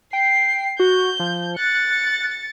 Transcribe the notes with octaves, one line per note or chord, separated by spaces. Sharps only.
G5 C7
F#4 G6
F3
F#6 A6 C#7